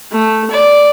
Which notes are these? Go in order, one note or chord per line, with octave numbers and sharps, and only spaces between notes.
A3
D5